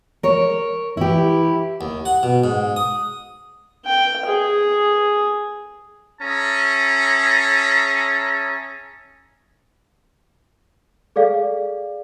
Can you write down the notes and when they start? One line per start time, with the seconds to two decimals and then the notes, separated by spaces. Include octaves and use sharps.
0.23 A#4 C#5
0.97 E3 E4 G4
1.81 D#2
2.05 F#5
2.23 B2
2.44 G#2
2.76 D#6
3.85 G5
4.26 G#4
6.21 C#4 G#4 E5 A5 A#5
11.16 G#4 A4 D5 F5